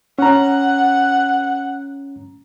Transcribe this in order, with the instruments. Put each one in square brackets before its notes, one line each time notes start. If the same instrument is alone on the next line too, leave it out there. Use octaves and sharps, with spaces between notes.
[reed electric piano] C#4 A#5 [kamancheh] F#5